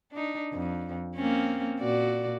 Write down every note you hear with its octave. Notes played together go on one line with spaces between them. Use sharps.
D4 D#4
F2
A#3 C4 C#4
A#2 F#4 D5